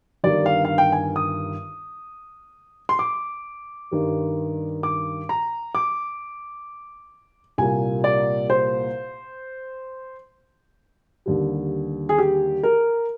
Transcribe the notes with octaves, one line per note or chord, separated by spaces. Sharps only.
G1 G2 D#3 G3 D5
F5
F5
G5
G#5
D#6
C6
D6
G2 D#3 G3
D6
A#5
D6
C2 A#2 G3 A#3 G#5
D5
C5
D#2 D3 G3
G#4
G4
A#4